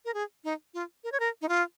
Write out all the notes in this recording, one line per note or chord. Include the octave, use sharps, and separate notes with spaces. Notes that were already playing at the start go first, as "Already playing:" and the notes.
A#4
G#4
D#4
F4
A#4
C#5
A#4
D#4
F4